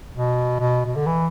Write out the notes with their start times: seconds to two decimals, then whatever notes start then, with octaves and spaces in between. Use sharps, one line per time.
0.14 B2
0.60 B2
0.86 B2
0.96 D3
1.06 E3